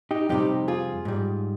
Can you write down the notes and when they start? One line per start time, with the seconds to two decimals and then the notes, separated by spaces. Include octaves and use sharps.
0.11 D#4 G4
0.29 F2 C3 G3 D#4 G4
0.68 F4 G#4
1.05 G#2 G3